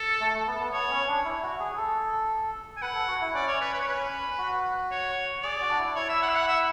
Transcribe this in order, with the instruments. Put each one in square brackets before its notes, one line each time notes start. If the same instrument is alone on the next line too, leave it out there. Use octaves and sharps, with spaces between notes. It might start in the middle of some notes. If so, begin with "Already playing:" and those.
Already playing: [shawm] A4
[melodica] A3
A3
B3
B3
[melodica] B3 [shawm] C#5
[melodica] C#4
D4
E4
F#4
G#4
A4
[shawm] G#5
[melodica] B4 [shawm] F#5
[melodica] A4
F#4
E4
[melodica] C#4 [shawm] D5
[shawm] C#5
B4
B4
C#5
B4
[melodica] F#4
[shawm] C#5
[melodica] G#4 [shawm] D5
[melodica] F#4
D4
E4
[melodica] E4 [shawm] C#5
[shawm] E5
F#5
E5
F#5
E5